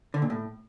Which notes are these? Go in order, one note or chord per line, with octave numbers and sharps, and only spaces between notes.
D3
A#2
A2